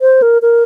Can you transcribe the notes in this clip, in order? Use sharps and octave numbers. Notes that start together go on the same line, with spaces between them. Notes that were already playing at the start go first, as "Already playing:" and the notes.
C5
A#4
A#4